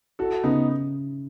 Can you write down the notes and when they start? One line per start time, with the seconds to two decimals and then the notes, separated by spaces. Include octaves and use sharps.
0.19 E4 F#4 A4
0.43 C#3 B3 D#4